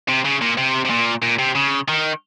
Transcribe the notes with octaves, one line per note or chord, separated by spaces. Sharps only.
C3
C#3
A#2
C3
C3
A#2
A#2
C3
C#3
D#3